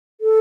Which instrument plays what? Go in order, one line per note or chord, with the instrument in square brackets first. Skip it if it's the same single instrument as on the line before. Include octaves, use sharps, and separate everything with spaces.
[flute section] A4